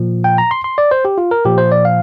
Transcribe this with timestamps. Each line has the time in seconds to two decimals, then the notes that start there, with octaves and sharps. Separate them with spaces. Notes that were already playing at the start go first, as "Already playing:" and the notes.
Already playing: A#2 F3
0.24 G5
0.38 A#5
0.51 C6
0.64 C6
0.78 D5
0.91 C5
1.05 G4
1.18 F4
1.31 A#4
1.45 A#2 F3 G4
1.58 C5
1.72 D5
1.85 F5